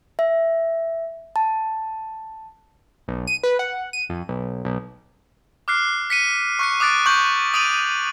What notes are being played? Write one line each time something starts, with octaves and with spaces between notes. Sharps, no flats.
E5
A5
B1
D#7
B4
F#5
D#7
F2
B1
B1
D6 F6 F#6 C7
B6 C#7 D#7
C#6 F#6 C#7
D6 D#6 F#6 A6 D7
C#6 F#6 G6 F#7
D#6 A6 D7 D#7 F7 F#7